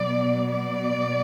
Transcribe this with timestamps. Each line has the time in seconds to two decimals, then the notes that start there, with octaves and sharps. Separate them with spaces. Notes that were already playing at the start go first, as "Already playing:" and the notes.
Already playing: B2 F#3 B3 D5
0.51 D5